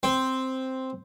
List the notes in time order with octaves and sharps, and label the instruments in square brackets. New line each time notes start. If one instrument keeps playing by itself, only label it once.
[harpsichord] C4